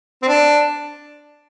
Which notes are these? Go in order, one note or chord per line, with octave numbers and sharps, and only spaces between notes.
C4
D4